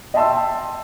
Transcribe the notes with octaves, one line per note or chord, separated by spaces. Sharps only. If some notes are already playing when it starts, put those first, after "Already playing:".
D#5 E5 G5 A5 C6 E6